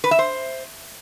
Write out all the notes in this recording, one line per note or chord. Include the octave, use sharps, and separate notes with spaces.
B4
E5
C5